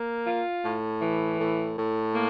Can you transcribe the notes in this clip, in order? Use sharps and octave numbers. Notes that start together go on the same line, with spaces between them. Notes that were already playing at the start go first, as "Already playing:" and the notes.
Already playing: A#3
F4
A2
E3
A2
A2
A#3